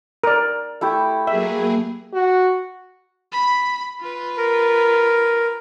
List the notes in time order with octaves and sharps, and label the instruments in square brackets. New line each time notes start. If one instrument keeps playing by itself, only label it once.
[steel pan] A#4 D5
[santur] A3 E4 G4
[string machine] F#3 A#3 G#4 [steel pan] E5
[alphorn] F#4
[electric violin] B5
F4 B4
[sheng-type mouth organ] A#4